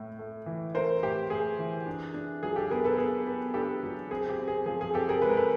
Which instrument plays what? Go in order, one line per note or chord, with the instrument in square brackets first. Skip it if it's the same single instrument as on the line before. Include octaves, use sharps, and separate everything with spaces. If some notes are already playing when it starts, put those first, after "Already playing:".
Already playing: [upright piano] A2 A3
A3
E3
A3 A#4 C5
A2 G4
A3 G#4
E3
D4
D4
F#3 G#4
G4 A4
B3 G#4 A#4
A4 B4
B3 G#4 A#4
B3
D4 G4 A4
F#3
C4 G#4
G4
C4
G#4
F3 G#4
G#4
C4 G4 A4
G#4 A#4
G#3 B4
A#4
A4 B4